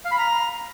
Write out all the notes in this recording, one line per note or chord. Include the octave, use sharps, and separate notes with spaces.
F5
B5
A#5